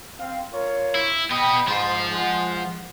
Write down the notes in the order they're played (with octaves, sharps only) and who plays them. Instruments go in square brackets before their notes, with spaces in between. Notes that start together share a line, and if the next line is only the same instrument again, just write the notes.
[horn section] C4 F5
F4 A#4 C#5
[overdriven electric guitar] E4
[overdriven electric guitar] B3 D#5 [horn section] G5 B5
[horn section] G#2 [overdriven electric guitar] F3 C5
[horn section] G#3 F#5